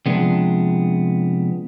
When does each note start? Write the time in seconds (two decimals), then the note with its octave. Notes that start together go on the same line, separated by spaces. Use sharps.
0.06 C3 F3 G#3 B3 D4